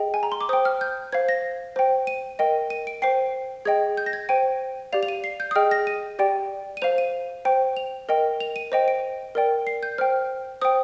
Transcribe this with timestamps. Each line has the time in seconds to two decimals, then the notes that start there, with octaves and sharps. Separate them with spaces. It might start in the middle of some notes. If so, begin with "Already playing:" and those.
Already playing: G#4 D#5 G5
0.14 G#5
0.23 A#5
0.32 C6
0.41 D6
0.49 C5 D#6
0.53 G5
0.65 F6
0.81 G6
1.12 C5 F5 G#6
1.29 A#6
1.76 C5 G5
2.07 D#7
2.39 A#4 D#5 G5
2.70 D#7
2.87 D7
3.02 C5 G5 C7
3.65 G#4 D#5 G5 G#6
3.97 G6
4.06 A#6
4.13 G#6
4.29 C5 G5 D#7
4.93 G4 D5 F5 F7
5.03 F7
5.08 D#7
5.24 C7
5.40 G6
5.51 D#6
5.56 G#4 D#5 G5 F6
5.71 A#6
5.87 D#7
6.19 G4 D5 G5
6.77 D#7
6.82 C5 F5 F7
6.98 D#7
7.45 C5 G5
7.77 F7
8.09 A#4 D#5 G5
8.40 F7
8.56 D#7
8.72 C5 D#5 G5
8.88 D7
9.35 A#4 D5 G5
9.67 C7
9.83 G6
9.98 C5 G5 F6
10.61 C5 G5 D#6